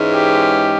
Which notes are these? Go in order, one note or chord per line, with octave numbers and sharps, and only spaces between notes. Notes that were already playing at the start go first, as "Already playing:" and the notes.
Already playing: G#2 E3 G#3 C#4
G4